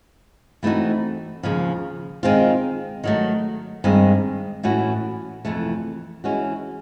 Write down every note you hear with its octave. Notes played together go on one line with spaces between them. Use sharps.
E3 A3 C4 D#4 F#4
D#2 C#3 F3
D#3 G#3 C4 F4
D#3 F#3 A3
G2 D#3 G#3 C4
A2 E3 A3 C#4 F#4
F2 C3 E3 A3
E3 G#3 C#4 F#4